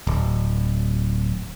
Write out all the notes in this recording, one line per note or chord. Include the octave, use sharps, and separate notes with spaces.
D1